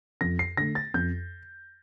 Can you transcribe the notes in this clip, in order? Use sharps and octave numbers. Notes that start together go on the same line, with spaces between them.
F2 A#6
C7
D3 A3 A#6
A6
F2 G6